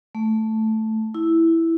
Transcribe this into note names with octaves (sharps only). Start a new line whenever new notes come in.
A3
E4